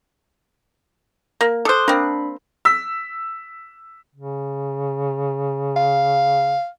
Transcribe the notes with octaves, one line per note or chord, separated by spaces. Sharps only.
A#3
A4 C5 D6 D#6 F#6
A#3 C4 D4 B5
E6 B6
C#3
F5